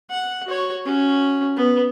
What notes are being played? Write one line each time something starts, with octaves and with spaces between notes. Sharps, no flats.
F#5
F#4 C#5
C#4 F#4
B3